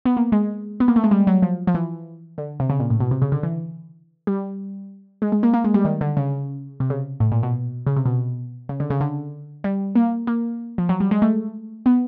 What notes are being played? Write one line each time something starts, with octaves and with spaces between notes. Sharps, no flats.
B3
A#3
G#3
B3
A#3
A3
G#3
G3
F#3
F3
F3
E3
D3
C3
C#3
A#2
A2
B2
C3
C#3
D3
E3
G3
G#3
G#3
A#3
A#3
G#3
G3
D#3
D3
C#3
C3
C#3
A2
A#2
B2
C#3
C3
B2
C#3
D3
C#3
D3
G3
A#3
A#3
F3
F#3
G3
G#3
A3
B3